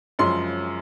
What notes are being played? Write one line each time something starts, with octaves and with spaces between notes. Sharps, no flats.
F#2 C#3 F3 G#3 C6